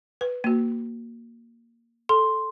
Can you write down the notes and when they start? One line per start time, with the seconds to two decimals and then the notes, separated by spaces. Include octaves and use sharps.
0.21 B4
0.44 A#3 F#4
2.09 A4 C6